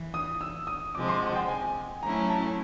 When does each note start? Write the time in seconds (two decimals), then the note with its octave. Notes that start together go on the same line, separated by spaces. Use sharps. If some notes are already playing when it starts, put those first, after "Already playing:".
Already playing: E3
0.14 D#6
0.41 E6
0.67 D#6
0.95 C3 F3 G#3 C4 D6
1.08 C6
1.22 F#5
1.35 G5
1.48 G#5
2.03 F#3 A3 C#4 E4 A#5
2.29 A5